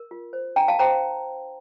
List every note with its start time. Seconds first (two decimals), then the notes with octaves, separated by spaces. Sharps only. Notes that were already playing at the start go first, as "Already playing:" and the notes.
Already playing: A#4
0.11 F4
0.33 C5
0.56 D4 G5 A#5
0.68 F5 A5
0.79 C5 G5 A#5